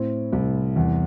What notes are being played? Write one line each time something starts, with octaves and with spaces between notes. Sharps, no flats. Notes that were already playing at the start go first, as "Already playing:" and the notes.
Already playing: A2 C4
C2
E2